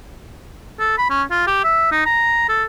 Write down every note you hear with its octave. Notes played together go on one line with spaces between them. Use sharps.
A4
B5
C#4
F4
G4
E5
D#4
A#5
A4